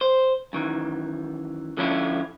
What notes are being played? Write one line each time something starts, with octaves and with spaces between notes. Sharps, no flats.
C5
F#2 D#3 E3
D3 F3 C#4 E4 F4